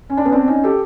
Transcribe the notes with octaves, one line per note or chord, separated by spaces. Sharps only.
C#4
D4
B3 C#4
C4 D4
C#4 D#4
G4 A4